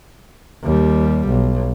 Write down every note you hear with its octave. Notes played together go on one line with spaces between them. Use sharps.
D#2 G3
B1